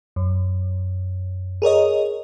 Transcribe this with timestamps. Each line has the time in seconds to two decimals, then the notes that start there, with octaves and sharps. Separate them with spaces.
0.16 F#2
1.62 G#4 A#4 C#5 D#5